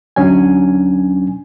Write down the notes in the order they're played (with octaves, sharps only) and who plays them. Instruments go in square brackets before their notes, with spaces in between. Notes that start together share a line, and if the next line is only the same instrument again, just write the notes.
[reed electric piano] D2 F#3 C#4 D4 G#5